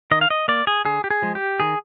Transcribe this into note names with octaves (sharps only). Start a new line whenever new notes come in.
D#3 D#5
F5
D#5
A#3 D5
G#4
D3 G#4
G4
G#4
F3 G#3
G4
D#3 G#4